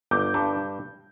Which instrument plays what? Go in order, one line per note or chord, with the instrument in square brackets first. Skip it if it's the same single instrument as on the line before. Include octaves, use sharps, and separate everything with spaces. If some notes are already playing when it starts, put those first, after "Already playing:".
[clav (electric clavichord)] G1 [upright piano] D6 G6
[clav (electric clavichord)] G2 [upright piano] A5 D6